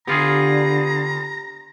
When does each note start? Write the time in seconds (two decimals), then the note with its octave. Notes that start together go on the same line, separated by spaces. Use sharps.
0.07 D3 B3 F4 G4 G#4 A#5